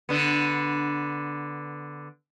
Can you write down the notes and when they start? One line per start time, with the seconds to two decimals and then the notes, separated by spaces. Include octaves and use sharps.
0.09 D3 B3